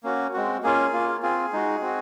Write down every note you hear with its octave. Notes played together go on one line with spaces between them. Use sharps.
A#3 C#4 F#4
G#3 C4 F#4
A#3 C#4 F4 G#4
A#3 F4
C4 F4 G#4
G#3 D#4 F#4
C4 F#4